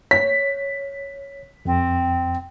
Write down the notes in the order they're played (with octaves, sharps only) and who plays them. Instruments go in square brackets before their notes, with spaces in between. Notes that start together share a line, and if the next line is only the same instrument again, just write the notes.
[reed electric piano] C#5 [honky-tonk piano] B6
[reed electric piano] F2 [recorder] C4